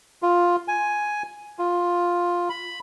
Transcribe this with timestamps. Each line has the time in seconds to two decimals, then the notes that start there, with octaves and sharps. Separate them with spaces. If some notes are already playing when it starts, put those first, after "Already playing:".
0.23 F4
0.68 G#5
1.59 F4
2.49 B5